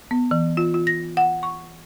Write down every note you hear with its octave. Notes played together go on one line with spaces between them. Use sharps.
B3
E3
F4
F4
A#6
F#5
C#6